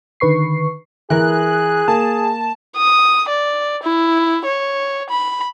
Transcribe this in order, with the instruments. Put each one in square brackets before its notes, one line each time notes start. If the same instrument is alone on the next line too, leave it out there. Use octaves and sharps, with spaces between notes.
[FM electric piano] D3 D#3 B4 C#6 C7
[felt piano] E3 A#4 [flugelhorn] G#4 [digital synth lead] F#6
[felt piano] A#3 [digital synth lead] A5
[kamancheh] D#6
D5
E4
C#5
B5